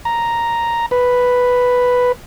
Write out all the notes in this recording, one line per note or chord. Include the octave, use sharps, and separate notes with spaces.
A#5
B4